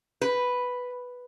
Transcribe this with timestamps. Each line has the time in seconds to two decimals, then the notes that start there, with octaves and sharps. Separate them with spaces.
0.21 B4